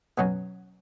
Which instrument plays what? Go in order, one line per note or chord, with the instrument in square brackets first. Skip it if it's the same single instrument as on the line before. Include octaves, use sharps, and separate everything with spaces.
[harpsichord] B2 F#3 C#4